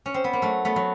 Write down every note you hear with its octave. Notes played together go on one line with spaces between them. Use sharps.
C#4
C4
B3
A#3
F#3 A3
A3 B3
F#3